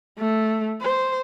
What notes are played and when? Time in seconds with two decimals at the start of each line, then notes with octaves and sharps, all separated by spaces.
0.19 A3
0.82 C5